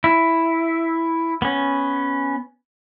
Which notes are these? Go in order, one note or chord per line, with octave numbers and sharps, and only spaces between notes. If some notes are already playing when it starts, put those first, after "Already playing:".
E4
B3 C#4